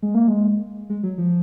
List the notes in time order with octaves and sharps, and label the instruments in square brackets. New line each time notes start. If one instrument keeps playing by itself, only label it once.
[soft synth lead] G#3
A#3
G#3
G#3
F#3
F3